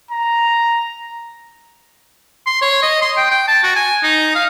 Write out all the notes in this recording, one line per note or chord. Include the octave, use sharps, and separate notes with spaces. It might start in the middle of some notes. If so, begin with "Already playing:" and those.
A#5
C6
C#5
D#5
C6
G5
G5
A5
F#4
G#5
D#4
F5